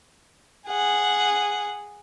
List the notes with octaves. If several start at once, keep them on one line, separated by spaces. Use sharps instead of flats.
G#4 F#5